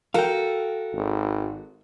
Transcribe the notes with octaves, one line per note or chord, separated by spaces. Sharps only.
F#4 A4 A#4 F5 G5
G#1